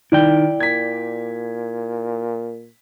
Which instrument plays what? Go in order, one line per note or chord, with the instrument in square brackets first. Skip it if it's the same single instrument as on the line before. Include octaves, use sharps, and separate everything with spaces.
[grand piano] D#3 [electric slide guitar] E4 D5 G5
[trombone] A#2 [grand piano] G#6 B6